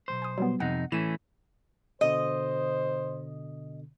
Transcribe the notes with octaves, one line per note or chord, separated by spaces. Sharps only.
B1 E2 C5
G#5 D#6
F#3 G3 B3
F2 C3 D#4 F#5
A2 E3 A3 C#4 E7
B2 D3 C5 D#5